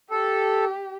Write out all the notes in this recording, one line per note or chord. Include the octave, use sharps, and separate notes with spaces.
G4 A4